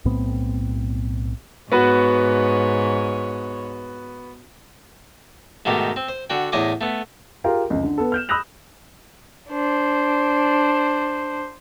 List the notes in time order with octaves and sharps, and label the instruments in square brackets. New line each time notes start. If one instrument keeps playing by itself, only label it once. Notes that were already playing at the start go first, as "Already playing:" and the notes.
[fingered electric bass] B1 A2 B3 C4
[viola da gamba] G#2 C#5 [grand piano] B3 F#4 B4
[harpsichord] G#2 B2 D#3 A3 G4
C4
C5
D3 F#4 G5
E2 A2 D#5 G#5 C6 D6
A3 B3
[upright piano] F4 G4 G#4 A#4 F5 G5
F1 C#2
D3
B3 A4
F6 G6 E7
B5 D#6 E6 F#6 A#6 F7
[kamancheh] D4 C5